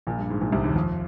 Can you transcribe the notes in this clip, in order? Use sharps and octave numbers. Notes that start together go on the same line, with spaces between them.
A#1 A#2
G2
G#2
A#1 A#2
C2 C3
D#2 D#3
F2 F3